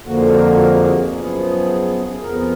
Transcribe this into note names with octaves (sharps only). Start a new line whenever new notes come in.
F2 D3 F3 A#3 F#4
F#4
A#4
F#4
A#4
G#4
F#4
G#4
F#2 F3 B3
F2 F3 B3 A#4